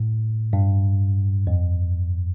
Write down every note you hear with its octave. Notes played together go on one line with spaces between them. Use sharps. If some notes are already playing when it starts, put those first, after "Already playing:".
Already playing: A2
G2
F2